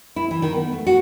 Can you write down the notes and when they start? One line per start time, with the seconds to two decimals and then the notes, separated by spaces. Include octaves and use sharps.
0.16 E4
0.31 E3
0.42 D#3
0.56 B3
0.72 A3
0.87 F#4